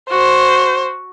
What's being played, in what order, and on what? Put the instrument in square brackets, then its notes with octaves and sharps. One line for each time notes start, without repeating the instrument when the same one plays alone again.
[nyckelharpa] F#4 [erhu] C5